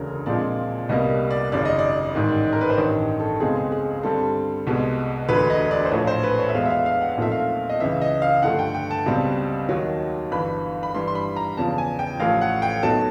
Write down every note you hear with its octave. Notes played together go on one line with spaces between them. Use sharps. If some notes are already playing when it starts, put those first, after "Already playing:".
Already playing: E1 D2 C#3 A#4
A#1 A#2 F3 G#3 C4 D5
C2 B2 G3 A#3 D#5
D5
G#1 F#2 C#3 D5
D#5
D5
A1 G#2 D#3
A#4
B4
C5
A1 G2 D#3 C#5
A4
C#2 B2 G#3 C4 G#4
G#4
G#4
G2 D3 G3 C4 A4
C2 B2 G#3
E1 D2 D3 B4
D#5
D5
C5
A#1 A2 F3 C#5
C5
B4
C#5
E5
E2 B2 G#3 B3 F5
E5
F5
F5
F#5
F5
B1 A#2 F3 A3 C4 E5
F5
D#5
C#2 C#3 E3 E5
D#5
F5
G2 D3 F3 A3 F#5
G5
G5
A5
C#2 B2 G3 C4
D#2 D#3 F#3
G1 G2 E3 B5
B5
G2 E3 G3 C6
C6
B5
A#5
E2 C#3 F3 A5
G#5
G5
A1 A2 F3 F5
F#5
G5
B1 B2 F#3 A3 A5